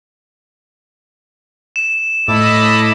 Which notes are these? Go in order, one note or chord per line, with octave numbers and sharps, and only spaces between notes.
E7
A2 E4 A4 D#5 A5 B5 D6